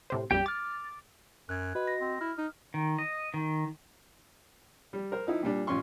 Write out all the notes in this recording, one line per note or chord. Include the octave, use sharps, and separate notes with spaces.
A2 C3 C5
B1 F#2 G3 G4 G5
D6 F6 A6
F#2 F#6 G#6
F#4 B4 D#5
A#6
C4
E4 F6
D#4
D#3
D#5
D#3
G3
A#4 C5
F3 D#4 E4
A#2 G3 D4
A1 C#4 F4 C6 C#6